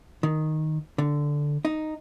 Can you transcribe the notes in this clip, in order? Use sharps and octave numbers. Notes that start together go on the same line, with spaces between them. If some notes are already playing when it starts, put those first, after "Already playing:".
D#3
D3
D#4